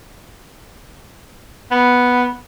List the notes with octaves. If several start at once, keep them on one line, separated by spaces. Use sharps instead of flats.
B3